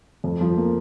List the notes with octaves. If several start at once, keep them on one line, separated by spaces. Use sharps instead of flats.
F2
F3
A#3